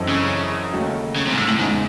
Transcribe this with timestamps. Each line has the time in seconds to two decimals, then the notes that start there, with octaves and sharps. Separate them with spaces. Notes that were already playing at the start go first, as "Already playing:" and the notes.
Already playing: F#2 E3 C4 D#4 A4
0.09 C#3
0.73 D#2 C#3 F#3 A3 D#4
1.16 C#3
1.27 C3
1.32 G#2
1.38 A2
1.48 A2
1.59 E2 G#2 C#3 G#3